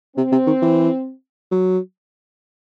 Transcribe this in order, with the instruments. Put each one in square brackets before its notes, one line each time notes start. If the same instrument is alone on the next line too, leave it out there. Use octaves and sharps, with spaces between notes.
[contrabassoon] C3 [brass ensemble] C4
[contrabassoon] C3
D#3
E3
F#3